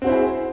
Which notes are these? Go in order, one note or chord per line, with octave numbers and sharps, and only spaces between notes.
C4 E4 F#4 G#4 C5